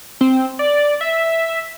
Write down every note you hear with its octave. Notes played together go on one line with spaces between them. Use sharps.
C4
D5
E5